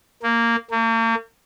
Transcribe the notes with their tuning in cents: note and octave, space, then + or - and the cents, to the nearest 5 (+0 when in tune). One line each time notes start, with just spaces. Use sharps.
A#3 -10
A#3 -40